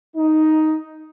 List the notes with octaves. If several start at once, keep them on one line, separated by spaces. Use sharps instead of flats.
D#4